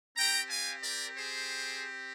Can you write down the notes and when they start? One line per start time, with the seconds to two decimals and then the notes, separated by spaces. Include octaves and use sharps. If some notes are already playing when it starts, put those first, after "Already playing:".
0.16 C4 G4 G5 A#5
0.50 F5 G#5
0.83 A#4 D5
1.16 G#4 C5